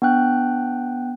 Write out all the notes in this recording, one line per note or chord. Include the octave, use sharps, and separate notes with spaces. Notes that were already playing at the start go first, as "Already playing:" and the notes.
B3 D4 G5 F#6